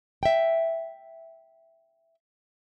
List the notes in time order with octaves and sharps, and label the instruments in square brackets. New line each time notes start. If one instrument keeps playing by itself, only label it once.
[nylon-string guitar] E5 G5